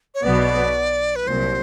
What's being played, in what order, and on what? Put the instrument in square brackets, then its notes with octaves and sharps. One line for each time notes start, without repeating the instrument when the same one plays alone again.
[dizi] C#5
[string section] B1 B2 F#3 B3 [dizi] D5
[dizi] B4
[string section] C2 A#2 F#3 [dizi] C5